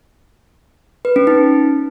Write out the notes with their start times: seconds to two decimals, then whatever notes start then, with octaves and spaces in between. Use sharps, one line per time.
1.05 B4
1.16 C#4
1.27 D#4